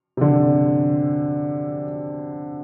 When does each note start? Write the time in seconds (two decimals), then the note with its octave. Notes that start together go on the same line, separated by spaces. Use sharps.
0.17 C3
0.21 D3